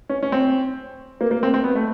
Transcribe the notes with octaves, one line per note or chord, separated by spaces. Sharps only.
C#4
C#4
C4
A#3
A#3
C4
C4
B3
A3